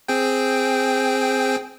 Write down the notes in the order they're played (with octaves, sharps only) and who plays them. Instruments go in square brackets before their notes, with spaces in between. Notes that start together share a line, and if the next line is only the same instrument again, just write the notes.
[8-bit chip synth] C4 G#4 G5